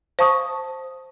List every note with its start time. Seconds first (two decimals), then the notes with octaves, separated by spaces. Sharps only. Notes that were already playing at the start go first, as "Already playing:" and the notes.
0.19 C5 F5 A5 C#6 D#6